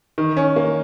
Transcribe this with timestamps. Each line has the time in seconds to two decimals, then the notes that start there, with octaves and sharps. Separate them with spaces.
0.18 D#3
0.37 C#4
0.56 A#3